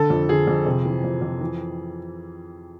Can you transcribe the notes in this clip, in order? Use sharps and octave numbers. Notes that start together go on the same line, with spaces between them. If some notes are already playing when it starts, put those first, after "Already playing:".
Already playing: D3 A4
F2
D3 G#4
F2
C3
E3
F2
F2
E3